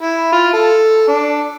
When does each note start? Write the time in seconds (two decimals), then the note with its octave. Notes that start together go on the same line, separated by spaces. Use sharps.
0.01 E4
0.32 F4
0.53 A4
1.08 D4